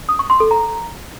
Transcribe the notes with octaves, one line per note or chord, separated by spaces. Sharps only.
D#6
C#6
C6
A4
A#5